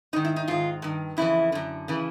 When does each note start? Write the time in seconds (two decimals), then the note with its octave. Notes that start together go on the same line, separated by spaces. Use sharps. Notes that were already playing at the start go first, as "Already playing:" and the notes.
0.13 G#2 D#4
0.16 D#3
0.25 E4
0.36 D#4
0.48 G#2 D#3 F4
0.82 G2 D#3
1.17 F2 C#3 E3 E4
1.52 F#2 D3
1.88 C#3 E3